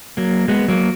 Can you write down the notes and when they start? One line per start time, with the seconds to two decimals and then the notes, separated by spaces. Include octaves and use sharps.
0.17 F#3 A#3
0.48 G#3 B3
0.68 F#3 A#3